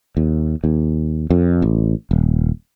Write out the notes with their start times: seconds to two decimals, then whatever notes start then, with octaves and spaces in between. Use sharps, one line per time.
0.17 D#2
0.64 D#2
1.30 F2
1.62 A1
2.11 D#1